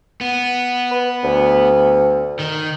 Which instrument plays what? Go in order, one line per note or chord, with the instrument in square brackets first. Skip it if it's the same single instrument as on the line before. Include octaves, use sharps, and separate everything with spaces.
[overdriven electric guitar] B3
[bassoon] B4
D2
[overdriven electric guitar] D#3